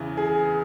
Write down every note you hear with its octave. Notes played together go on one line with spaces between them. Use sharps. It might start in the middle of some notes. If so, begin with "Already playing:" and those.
Already playing: E2 C#3 E3
G#4